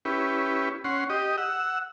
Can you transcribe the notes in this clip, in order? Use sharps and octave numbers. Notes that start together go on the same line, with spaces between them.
C#4 E4 G4 B4
C#4 F#5 C6
G4 D#5
F#5 E6